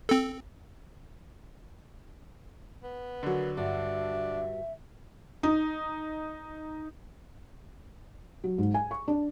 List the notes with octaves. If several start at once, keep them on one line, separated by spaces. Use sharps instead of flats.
C4 A4
B3
D#2 D3 F#3
G2 D4 F#4 E5
D#4
F#3
G#2
G#5
C#6
D4